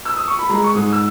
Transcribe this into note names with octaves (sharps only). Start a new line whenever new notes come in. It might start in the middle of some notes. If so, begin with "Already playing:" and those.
E6
D#6
C#6
B5
G#3 A#5
C#6
G#2 D#6
E6